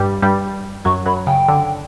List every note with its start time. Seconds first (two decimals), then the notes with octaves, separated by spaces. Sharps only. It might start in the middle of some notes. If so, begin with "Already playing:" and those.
Already playing: G2 G3
0.22 G2 G3
0.85 F#2 F#3 C#6
1.06 F#2 F#3 B5
1.27 C#3 G5
1.48 D3